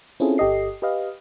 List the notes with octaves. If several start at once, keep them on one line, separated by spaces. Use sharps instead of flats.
C4 C#4 E4 F4 G#4 A4
G1 G4 A4 D#5 C7
G4 B4 D#5 F5